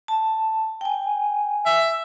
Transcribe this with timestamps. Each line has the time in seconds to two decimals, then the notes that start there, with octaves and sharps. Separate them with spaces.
0.08 A5
0.81 G5 G#5
1.66 E5